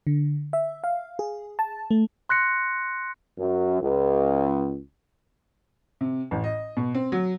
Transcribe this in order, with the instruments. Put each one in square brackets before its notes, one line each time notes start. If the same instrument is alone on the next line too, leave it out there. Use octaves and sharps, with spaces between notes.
[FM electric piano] D3
E5
F5
G#4
A5
A3
[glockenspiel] C6 F#6 A#6 C#7
[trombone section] F#2
C#2
[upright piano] C3
A1
D#5
B2
C4
F#3